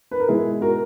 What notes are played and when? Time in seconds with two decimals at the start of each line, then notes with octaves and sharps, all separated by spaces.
0.11 B4
0.20 A#4
0.28 B2 G#3 E4 G#4
0.61 F#4 A#4